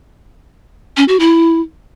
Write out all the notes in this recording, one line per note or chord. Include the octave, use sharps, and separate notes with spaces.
C#4
F#4
E4